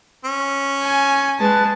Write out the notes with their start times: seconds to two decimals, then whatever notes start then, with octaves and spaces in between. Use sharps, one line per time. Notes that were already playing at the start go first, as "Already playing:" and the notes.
0.25 C#4
0.84 G#5
1.40 G#3 B4 A5